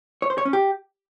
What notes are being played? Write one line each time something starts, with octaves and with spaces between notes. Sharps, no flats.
C#5
C5
C#5
C#4
G4